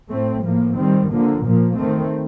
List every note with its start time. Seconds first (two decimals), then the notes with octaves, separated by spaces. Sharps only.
0.11 A2 A3 C4
0.44 A2 F3 A#3
0.77 D#3 G3 C4
1.11 D3 F3 A#3
1.44 A#2 F3 A#3
1.78 D#3 A3 C4